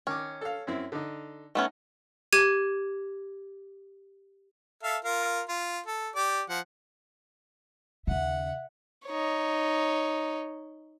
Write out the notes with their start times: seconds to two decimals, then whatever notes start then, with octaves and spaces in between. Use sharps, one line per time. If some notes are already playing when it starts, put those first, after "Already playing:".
0.07 D#3 C#4 D6
0.41 A4 F5
0.67 F#2 C4 E4
0.92 D3 D#4
1.55 A3 B3 C#4 D#4 F#5
2.33 G4 G#6 D#7
4.83 A4 E5 F5
5.05 F4 A#4 F5
5.49 F4
5.86 A4
6.16 G4 D5 D6
6.49 F3 F#5
8.07 D#2 C#3 E5 F#5
9.06 D#4 C#5